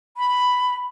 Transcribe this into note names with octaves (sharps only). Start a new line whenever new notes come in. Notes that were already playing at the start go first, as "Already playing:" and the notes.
B5